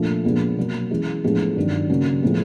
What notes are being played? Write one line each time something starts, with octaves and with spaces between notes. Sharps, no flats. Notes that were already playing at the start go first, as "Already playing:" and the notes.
Already playing: A#2 F3 A3 D4
A#2 F3 G#3 B3 D4
B2 F#3 A#3
E3 G#3 C#4
A2 F3 G#3 B3 D4
G2 D#3 F#3
C#3 F#3 A#3 C#4
A2 F3 G#3 B3